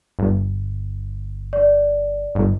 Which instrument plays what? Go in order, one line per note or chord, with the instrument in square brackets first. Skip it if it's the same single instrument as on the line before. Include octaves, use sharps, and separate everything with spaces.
[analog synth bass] G1
[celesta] D5
[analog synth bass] G1